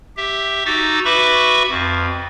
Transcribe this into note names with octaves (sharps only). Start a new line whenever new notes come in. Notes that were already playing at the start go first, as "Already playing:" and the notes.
G4 E5
D#4 F#4 D6 E6 A6
F#4 B4 E5 B5 C#6 D6
F2